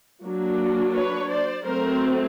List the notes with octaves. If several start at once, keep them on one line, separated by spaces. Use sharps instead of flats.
F#3 A#3 D4
B4 C#5
C5 D5
F#3 A3 C4 A#4 C5